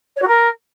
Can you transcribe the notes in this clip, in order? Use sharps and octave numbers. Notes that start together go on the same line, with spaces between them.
C#5
F#4
A#4